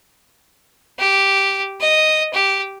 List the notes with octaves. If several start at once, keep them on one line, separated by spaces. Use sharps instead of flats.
G4
D#5
G4